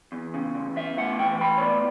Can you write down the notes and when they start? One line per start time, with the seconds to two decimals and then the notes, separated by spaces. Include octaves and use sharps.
0.12 E2
0.34 C#3
0.55 E2
0.76 B3 E5
0.97 A2 F#5
1.19 E3 G5
1.40 A2 B5
1.58 C#5
1.61 B3 D5